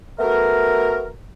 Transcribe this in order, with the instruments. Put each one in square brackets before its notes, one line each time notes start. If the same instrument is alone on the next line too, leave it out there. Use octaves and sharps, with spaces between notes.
[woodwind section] A3 B3 F#4 A#4